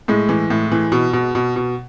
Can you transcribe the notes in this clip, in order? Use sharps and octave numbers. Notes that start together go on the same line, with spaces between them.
A2 G#3
E3
A2
E3
B2
B2
B2
B2